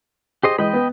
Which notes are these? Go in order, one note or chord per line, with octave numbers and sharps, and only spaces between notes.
G4 G#4 C5 D#5
E3 G#3 D#5 G5 B5 D#6
B3